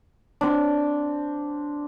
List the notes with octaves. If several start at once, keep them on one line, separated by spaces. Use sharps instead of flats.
C4 D4